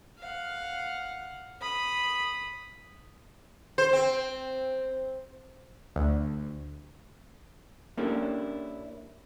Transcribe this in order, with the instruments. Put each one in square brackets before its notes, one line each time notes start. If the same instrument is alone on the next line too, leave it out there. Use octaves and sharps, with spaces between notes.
[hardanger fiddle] F5 F#5
B5 D#6
[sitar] C5
C4
[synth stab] D2
[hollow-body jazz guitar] A#3 C#4 D4 E4 G4 A4